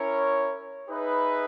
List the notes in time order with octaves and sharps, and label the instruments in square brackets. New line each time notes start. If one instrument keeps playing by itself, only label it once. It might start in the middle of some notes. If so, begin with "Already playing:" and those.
Already playing: [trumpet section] C#4 E4 A#4 C#5
D#4 G#4 B4 E5